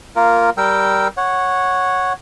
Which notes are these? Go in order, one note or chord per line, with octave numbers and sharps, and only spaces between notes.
A#3 F4 A#4
G3 A#4 G5 E6
C#5 F#5